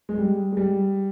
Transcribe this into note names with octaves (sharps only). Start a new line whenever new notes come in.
G#3
G3
G#3
G3